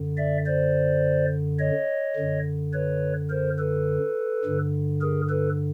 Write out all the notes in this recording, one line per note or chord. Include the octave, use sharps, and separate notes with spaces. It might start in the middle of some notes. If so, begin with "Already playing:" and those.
Already playing: F#2 D3
D5 E5
C5 D5
C#5 D#5
F#2 D3
B4 C#5
A#4 C5
A4 B4
G2 D3
G#4 A#4
A4 B4